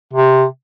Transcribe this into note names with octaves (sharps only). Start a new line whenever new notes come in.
C3